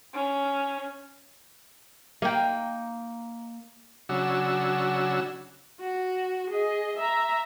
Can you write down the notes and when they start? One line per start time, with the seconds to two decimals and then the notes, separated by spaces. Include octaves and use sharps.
0.14 C#4
2.22 A#3 D#4 G5
4.09 C#3 F#3 D4 F#4 E6
5.80 F#4
6.50 G#4 D#5
6.97 E5 A#5